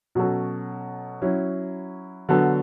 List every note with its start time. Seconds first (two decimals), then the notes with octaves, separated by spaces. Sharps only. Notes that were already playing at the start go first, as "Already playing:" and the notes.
0.15 B2 F#3 C#4 F#4 A4
1.22 F#3 C#4 E4
2.29 D3 F#3 B3 F#4 A4